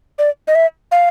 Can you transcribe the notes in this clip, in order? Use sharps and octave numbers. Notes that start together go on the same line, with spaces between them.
D5
D#5
E5
F5